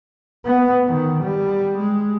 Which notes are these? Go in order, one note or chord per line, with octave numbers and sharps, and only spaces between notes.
B3
D#3
G3
G#3